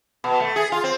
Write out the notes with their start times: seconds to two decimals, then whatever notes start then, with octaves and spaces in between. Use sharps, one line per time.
0.24 B2
0.40 A3
0.56 G#4
0.72 F4
0.84 C4